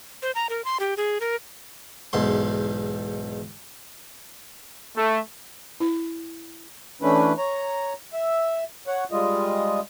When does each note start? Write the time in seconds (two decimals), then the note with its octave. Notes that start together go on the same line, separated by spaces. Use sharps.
0.22 C5
0.35 A#5
0.49 A#4
0.65 C6
0.80 G4
0.97 G#4
1.21 A#4
2.13 B1 E2 G#2 C6
4.95 A3
5.80 E4
7.02 E3 A3 C#4 D4 E4 B4
7.38 C#5 A#5
8.13 E5
8.87 C#5 F#5
9.12 G3 G#3 F4 D#5